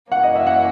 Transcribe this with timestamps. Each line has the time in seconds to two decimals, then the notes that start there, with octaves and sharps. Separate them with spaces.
0.11 F#2 E3 A#3 C#4 F#5
0.23 D#5
0.36 E5
0.47 F#5